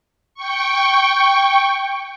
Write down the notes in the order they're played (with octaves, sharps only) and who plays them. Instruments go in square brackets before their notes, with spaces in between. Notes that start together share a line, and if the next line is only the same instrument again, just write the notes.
[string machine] G5 C#6